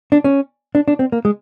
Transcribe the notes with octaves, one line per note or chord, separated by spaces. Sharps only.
D4
C#4
D4
D4
C4
A#3
G#3